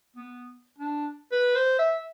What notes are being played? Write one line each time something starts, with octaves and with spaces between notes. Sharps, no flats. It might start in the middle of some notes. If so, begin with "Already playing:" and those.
B3
D4
B4
C5
E5